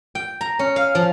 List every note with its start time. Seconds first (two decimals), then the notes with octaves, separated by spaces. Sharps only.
0.15 G5
0.41 A#5
0.59 C#4
0.76 F5
0.95 F3